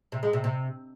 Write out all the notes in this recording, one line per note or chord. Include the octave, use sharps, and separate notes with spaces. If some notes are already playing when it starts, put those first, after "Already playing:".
C3
G#3
C3
C3